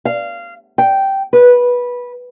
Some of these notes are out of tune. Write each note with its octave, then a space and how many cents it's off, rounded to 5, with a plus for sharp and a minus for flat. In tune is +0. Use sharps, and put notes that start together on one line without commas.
F5 -20
G5 -10
B4 -15